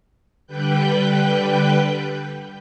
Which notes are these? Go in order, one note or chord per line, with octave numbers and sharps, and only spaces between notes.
D3 G3 B4 G5 F#6 G6